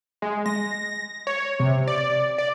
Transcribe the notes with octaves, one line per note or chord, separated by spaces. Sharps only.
G#3
A#6
C#5
C3
D5
D5